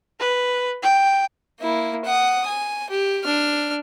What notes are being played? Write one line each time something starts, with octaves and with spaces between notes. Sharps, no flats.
B4
G5
A#3 E4
F#5 D#6
G#5
G4
D4 F6